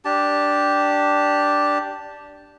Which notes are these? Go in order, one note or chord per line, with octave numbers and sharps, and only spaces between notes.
D4 G4 A5